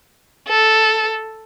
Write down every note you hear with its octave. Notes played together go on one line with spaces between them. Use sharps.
A4